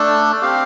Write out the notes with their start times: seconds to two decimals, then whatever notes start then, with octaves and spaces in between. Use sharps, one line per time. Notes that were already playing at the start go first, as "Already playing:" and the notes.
Already playing: A3 D4 A4
0.42 C4 G4 F5